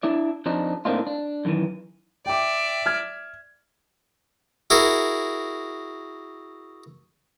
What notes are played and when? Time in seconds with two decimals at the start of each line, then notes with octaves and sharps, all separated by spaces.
0.03 D4 E4 D5
0.46 F2 F3 D4 D#4
0.85 A2 A#3 C4 D4 D#4 F4
1.07 D4
1.45 F#2 D#3 E3
2.26 D5 E5 G5 D6
2.86 F6 G#6
4.70 E4 F#4 G#4 A#4